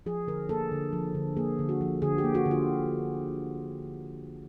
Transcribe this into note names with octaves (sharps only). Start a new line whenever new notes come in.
F3 G#4
D3 A#4
A#3 A4
D3
F3
D3
A#3 G#4
D3
F#4
F3
D3 G#4
G4
A#3
F#4
D3
F4